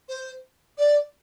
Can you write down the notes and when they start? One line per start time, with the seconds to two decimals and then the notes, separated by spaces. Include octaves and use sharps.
0.09 C5
0.78 D5